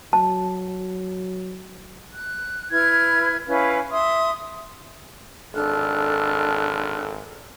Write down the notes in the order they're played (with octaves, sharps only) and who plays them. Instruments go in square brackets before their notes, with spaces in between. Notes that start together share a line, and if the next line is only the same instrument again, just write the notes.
[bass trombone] F#3 [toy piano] A5
[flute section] F#6
E4 B4 F6 G#6
C#4 E4 B4 F5
E5 C6 D#6
[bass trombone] G#1 [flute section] D4 F6 F#6 [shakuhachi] A4